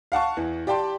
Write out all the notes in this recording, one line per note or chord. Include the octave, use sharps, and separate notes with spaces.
F5 F#5 A5 C#6
E2 E3
G4 D5 G5 A5 C6